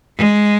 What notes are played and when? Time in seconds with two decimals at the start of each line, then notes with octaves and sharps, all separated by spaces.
0.18 G#3